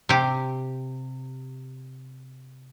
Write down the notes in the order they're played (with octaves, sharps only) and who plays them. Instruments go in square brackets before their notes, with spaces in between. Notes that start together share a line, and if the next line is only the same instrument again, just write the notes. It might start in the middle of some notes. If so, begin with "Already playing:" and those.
[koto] C3 G4